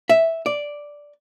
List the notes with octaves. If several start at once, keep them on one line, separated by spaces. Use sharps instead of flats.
E5
D5